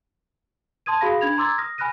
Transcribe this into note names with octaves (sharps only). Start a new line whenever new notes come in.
A5 C6 D#6 G#6 D#7
F#4 G#4 F5 B5 D#6 A#6
D4 B5 G#6 F7
A#5 C6 D6 E6 G#6 A6
D#6 F6 A#6
G#5 B5 F6 F#6 A#6 D#7